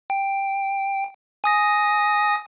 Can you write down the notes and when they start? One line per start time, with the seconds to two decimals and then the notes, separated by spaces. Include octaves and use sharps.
0.10 G5
1.44 G#5 D#6 A#6